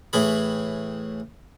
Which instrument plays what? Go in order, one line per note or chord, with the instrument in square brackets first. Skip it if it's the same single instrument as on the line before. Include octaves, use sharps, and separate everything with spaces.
[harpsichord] A2 E3 G#4 B5